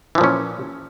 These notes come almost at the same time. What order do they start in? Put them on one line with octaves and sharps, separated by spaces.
E3 F3 A#2 C#4